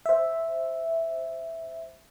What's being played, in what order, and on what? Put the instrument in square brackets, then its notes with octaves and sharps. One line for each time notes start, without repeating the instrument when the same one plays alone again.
[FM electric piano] C5 E5